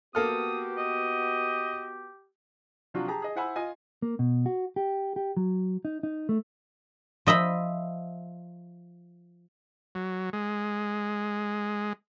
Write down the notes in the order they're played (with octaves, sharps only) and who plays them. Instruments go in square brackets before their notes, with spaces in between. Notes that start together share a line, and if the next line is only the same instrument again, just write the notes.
[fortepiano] A#3 A4 F6 [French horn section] B3 F#4 [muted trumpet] G4 [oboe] D#6
[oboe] D#5
[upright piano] C3 F3 F#3 D4 F4 F#4
G4 G#4 A5 A#5
G#4 D#5
E4 C5 F#5 G#5 B5 E6
F4 D#5 G#5
[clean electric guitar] A#3
B2
F#4
G4
G4
F#3
D#4
D#4
A3
[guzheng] F3 D#5 E5 B5
[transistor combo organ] F#3
G#3